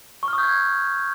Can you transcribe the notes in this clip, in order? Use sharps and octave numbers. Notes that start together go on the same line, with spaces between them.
C#6
F6
D#6
G6
G#6